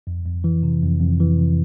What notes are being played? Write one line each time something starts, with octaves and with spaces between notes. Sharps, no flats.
F2
F2
E3
C3
F2
F2
E3
C3